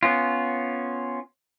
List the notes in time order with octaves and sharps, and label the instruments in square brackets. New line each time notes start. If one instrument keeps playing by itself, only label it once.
[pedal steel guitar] B3 C#4 F4